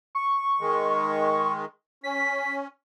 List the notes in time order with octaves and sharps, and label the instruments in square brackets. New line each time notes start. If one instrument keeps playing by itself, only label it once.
[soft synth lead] C#6
[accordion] D#3 G#3
[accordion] C#4 [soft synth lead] B6